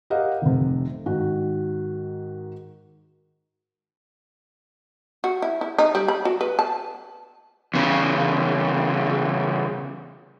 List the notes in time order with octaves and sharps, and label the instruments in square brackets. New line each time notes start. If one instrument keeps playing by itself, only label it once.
[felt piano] G4 A#4 D#5 F5 F#5
F1 C3
G#2 D#3 F#4
[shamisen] F#4
E4
E4
D#4
G3
B5
F#4
B4
A5
[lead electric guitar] E2 C#3